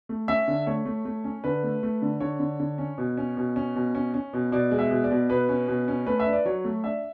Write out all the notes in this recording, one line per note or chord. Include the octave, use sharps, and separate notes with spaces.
A3
C#4 E5
D3
A3 C#5
A3
A3
C#4
D3 B4
A3
A3
D3
D3 C#5
D3
D3
C#4
B2
C#4
B2
C#4
B2
C#4
C#4
B2
B2 D5
G#3
E5
B2
D5
B2
B2 B4
C#4
B2
C#4
A3 B4
E5
D4
D5
F#3 C#5
A3
D4 E5